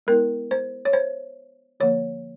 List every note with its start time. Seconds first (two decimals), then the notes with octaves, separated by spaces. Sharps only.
0.07 G#3 B3 E4 A#4
0.51 C5
0.85 C#5
0.93 C5
1.80 D3 F3 A#3 C#5